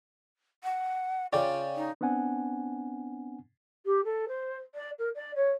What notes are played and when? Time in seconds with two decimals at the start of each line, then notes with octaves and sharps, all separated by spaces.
0.64 F#5
1.33 C#3 C#4 F4 D5 G5 D6
1.76 D#4
2.01 B3 C4 D4 F#5 G#5
3.85 G4
4.04 A4
4.28 C5
4.74 D5
4.98 A#4
5.15 D5
5.35 C#5